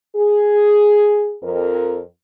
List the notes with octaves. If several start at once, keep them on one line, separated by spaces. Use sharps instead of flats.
G#4
F2 A#4